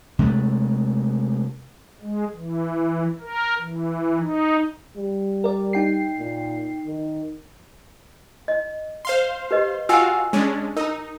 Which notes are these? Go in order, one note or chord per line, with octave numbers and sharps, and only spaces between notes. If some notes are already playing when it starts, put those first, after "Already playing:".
C3 G#3 A3
G#3
E3
A#4
E3
D#4
G3
A#4 D5
D#4 G5 C7
A#2
D#3
D#5
C5 F5 C6
G4 B4 D#5
F4 F#4 F5 G5 G#5 E6
G#3 C#4 D4
D#4 A#4 A#5